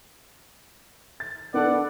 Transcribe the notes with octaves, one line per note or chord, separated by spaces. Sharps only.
A6
B3 D4 A4 D5 F#5